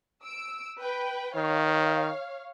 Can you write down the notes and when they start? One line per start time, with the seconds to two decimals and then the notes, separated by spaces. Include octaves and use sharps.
0.23 E6 D7
0.80 B4 G5
1.36 D#3 C#5 F5